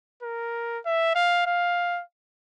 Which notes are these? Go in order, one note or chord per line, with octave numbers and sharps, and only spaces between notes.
A#4
E5
F5
F5